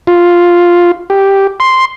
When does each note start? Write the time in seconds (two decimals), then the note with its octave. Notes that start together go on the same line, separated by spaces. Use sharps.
0.07 F4
1.10 G4
1.60 C6